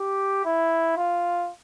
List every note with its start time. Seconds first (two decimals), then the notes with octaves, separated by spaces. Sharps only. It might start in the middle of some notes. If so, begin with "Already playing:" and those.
Already playing: G4
0.45 E4
0.97 F4